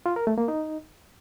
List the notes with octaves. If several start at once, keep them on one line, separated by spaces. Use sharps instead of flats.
F4
A#4
A3
A#3
D#4